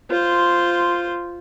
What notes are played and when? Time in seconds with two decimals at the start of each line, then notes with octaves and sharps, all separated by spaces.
0.11 F4 C5